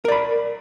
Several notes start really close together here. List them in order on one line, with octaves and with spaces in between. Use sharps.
A#4 D5 B5